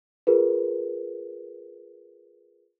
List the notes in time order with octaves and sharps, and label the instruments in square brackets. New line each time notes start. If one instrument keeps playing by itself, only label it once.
[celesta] F4 G#4 A#4 B4